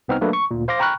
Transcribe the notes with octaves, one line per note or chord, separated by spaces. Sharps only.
C2 B3 C4 D#4 F6
F#3 A3 A#3 D4 A4 B4
C#6
D2 A#2
C5 F5 C6 D6 A#6
G5 A#5 B5 C#6 F6 F#6